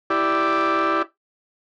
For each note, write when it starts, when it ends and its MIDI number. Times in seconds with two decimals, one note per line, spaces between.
0.10 1.02 64
0.10 1.02 67
0.10 1.02 74